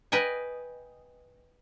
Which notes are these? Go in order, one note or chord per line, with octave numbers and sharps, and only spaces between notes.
B4 D#5 G5 G#5